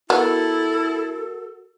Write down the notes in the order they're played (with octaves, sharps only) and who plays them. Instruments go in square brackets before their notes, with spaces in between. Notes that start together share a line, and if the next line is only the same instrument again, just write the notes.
[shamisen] B3 [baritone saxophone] E4 [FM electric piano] F#4 A#4 [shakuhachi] A4